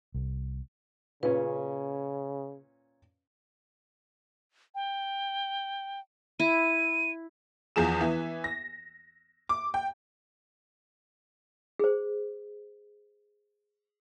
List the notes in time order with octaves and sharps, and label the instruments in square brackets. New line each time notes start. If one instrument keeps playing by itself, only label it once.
[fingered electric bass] C2
[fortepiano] A#2 C#4 [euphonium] C#3 [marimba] B4
[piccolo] G5
[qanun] E4 [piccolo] D#7
[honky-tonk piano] E2 F3 G#4 E7
E3 B3
A#6
D6
G5
[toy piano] G#4 C5